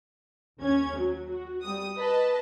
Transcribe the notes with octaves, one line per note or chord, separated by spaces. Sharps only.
D#2 C#4 G#6
F#3
F#4
G3 D#6
B4 D#5 A5